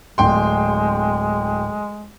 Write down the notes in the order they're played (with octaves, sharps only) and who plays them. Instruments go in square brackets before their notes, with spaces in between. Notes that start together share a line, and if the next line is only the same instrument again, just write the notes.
[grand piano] D1 G5 C6 [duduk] G#3